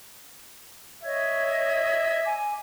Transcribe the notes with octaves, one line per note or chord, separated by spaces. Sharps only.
C#5 D#5 E5 G#6
G#5 D6